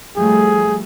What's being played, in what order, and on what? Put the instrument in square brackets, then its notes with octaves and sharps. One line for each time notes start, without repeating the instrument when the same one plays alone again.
[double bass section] F3 G3 A3 [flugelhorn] G#4